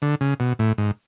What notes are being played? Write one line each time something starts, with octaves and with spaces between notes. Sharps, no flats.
D3
C#3
B2
A2
G#2